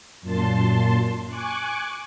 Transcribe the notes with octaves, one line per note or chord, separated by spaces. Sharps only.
F#2 A#2 A5 C6
G#5 C#6 D6 F#6